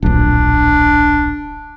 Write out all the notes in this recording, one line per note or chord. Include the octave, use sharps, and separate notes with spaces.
D1 A#1 D4